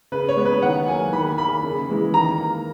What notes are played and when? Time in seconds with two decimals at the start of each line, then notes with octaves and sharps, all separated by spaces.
0.12 C#3 B4
0.29 C#5
0.37 G#3 B3
0.45 B4
0.62 D#3 F#5
0.87 F#3 A#3 G#5
1.13 D#3 B5
1.38 A#3 B5
1.64 C#3
1.89 E3 G#3
2.14 D#3 A#5
2.39 A#3